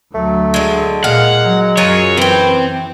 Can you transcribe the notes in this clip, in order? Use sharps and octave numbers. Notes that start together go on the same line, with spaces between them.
D2 F#3 A3
D3 G#3
A#2 G#3 F5 F#5
F#3
F#2 F#3 F4 G#4 C#5
E3 C4 B4 G5